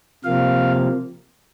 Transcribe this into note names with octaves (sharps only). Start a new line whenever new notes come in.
C3 F3 A#3 F5